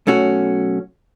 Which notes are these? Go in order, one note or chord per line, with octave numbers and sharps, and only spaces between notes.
B1 A3 C#4 F#4